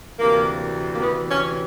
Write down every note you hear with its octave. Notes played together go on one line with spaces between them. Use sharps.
D2 C3 E3 A#3
A#3
D2 C3 E3 B3
C#4